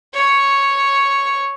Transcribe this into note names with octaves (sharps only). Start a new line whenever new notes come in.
C#5